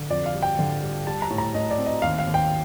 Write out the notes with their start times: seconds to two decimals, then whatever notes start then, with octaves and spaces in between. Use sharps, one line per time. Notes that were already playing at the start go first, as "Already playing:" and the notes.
Already playing: D3
0.10 F2 D5
0.26 F5
0.34 G3
0.42 G5
0.59 D3
0.82 G3
1.06 G3 A5
1.22 A#5
1.30 A2
1.38 A#5
1.55 A2 D#5
1.71 D5
1.78 C4
1.86 D#5
2.02 D#2 F5
2.18 F5
2.27 D#2
2.34 G5